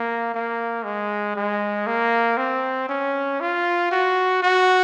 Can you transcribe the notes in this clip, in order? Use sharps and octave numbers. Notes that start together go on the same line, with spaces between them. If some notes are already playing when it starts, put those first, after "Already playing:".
Already playing: A#3
A#3
G#3
G#3
A#3
C4
C#4
F4
F#4
F#4